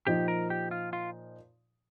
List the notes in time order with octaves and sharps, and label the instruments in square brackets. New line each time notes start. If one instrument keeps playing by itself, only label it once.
[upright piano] A#2 F3 D#4 [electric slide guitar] G4
[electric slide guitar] A#4
G4
F4
F4